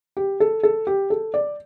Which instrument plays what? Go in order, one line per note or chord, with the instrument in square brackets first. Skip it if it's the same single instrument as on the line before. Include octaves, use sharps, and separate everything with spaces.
[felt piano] G4
A4
A4
G4
A4
D5